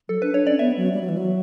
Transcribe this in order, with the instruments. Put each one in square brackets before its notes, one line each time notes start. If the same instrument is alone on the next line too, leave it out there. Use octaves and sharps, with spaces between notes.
[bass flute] F#3 [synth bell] A4
[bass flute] D4 [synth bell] B4
[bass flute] D4 [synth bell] C#5
[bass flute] C#4 [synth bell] D5
[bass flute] B3 [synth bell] E5
[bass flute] F#3
G3
F#3
E3
F#3